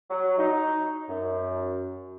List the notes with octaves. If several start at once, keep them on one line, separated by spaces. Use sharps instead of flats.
F#3
D#4
F#2